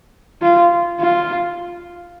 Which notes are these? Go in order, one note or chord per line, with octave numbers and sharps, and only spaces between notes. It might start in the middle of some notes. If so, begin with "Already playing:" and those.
F4
F4